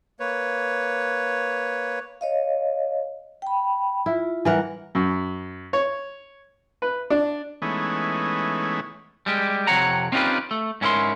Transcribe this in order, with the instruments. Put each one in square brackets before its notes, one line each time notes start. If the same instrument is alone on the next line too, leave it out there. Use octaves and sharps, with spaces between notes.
[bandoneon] A#3 B4 C#5
[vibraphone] C#5 D#5 F5
G5 B5
[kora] E4 [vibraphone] F4
[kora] E3 A#4 F#5 [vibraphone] G3
[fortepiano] F#2
C#5
B4
D4
[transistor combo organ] E3 G#3 A3 B3 C#4 D#4
[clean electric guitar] G3 G#3 G4
F2 C3 C#5 F#5 A#5
C4 C#4 D#4 F4 G4 B4
A3
G#2 C#4 E4 A#4 C6